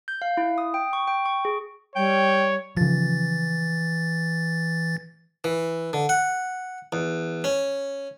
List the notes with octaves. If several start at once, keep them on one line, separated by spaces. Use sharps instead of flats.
G6
F5
E4
D#6
G5
C#6
G5
C#6
G#4
G3 C#5 G5
C#3 E3 F3 A6
E3
D3
F#5
E2
C#4